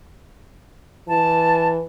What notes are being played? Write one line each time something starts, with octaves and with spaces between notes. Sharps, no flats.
E3 A5